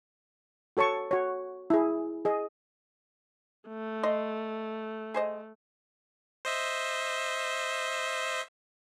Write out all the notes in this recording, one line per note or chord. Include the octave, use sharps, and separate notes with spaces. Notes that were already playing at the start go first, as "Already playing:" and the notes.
F#4 A4 C#5 A5 C#6
F#4 C#5
E4 G#4
G#4 D#5
A3
D#5 C6
G#4 C5 D#5
C5 D#5 E5